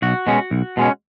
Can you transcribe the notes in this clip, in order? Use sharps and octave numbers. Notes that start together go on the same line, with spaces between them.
B1 F#4
B2 G#3 C#4
B1
B2 G#3 C#4